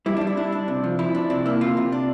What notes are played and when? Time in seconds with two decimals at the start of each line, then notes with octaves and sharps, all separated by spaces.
0.06 G3 E4
0.17 G3 D4
0.27 E4
0.37 D4 E4
0.52 D4
0.68 C3
0.84 F3
0.99 F3 E4
1.15 D4
1.30 C3 D4
1.46 A#3 E4
1.61 C3 F4
1.77 C3
1.92 D4